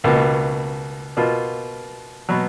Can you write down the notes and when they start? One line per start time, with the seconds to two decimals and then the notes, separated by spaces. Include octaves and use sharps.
0.04 C#2 B2 A#3
1.17 B2 A#3 F4
2.29 B2 F#3 B3